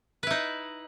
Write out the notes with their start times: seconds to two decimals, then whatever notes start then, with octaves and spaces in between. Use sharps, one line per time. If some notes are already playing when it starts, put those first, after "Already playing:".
0.23 B4
0.27 E4
0.30 D#4